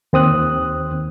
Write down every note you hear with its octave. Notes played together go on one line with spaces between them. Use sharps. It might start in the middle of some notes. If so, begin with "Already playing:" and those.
D#2 C4 D#6 F#6